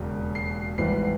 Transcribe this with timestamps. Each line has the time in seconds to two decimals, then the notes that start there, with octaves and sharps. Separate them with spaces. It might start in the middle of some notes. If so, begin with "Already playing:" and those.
Already playing: E1 D#2 C#3 F#3
0.35 C7
0.78 G#1 G#2 E3 G3 C7